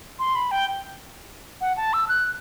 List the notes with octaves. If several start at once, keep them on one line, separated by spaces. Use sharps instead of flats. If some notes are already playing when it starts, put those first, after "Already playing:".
C6
B5
G5
F#5
A5
E6
F#6